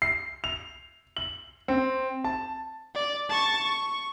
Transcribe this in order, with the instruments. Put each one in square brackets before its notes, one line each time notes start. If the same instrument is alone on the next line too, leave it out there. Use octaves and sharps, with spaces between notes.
[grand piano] C7
F7
F#7
C4
A5
[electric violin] D5
A5 C#6
C#6